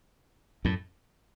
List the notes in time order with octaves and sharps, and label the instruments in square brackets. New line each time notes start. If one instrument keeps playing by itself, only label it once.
[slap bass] F#2 A2